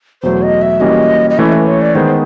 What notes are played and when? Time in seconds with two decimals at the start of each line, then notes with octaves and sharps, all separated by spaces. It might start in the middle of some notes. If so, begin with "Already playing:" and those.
0.23 E2 B2 F#3 A3 C5
0.42 D#5
0.62 E5
0.80 E3 G3 A#3 C#4 F#4 D#5
1.30 D#5
1.38 E3 A3 C#4 E5
1.52 B4
1.67 C#5
1.81 D5
1.95 D#3 G#3 B3 C5